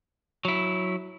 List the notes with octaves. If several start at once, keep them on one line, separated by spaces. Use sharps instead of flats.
F#3 E4